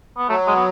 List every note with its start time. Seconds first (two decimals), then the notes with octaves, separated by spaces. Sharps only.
0.17 B3
0.29 F#3 A3
0.47 G#3
0.56 B3